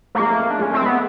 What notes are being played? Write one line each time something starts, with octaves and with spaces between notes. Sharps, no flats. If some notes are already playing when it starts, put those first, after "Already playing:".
A3
G#3 A#3
A3
G#3
D4
G#3 C#4
A3 C4
G#3 B3